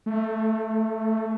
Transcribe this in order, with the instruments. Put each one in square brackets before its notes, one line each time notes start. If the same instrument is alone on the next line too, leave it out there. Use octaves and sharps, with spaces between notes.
[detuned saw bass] A3